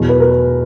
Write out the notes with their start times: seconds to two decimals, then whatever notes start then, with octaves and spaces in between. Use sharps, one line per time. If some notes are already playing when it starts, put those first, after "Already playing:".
Already playing: E2 B2 F#3
0.09 B4
0.20 A#4